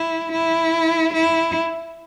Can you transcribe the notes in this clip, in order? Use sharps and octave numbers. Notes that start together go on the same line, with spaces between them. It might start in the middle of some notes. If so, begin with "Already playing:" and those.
Already playing: E4
E4
E4